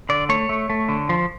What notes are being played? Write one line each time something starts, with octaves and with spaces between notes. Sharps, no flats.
D3 D5
A3 C#5
A3
A3
D3
F3